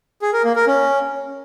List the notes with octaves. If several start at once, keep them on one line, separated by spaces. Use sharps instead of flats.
G#4
A#4
A#3
A#4
C#4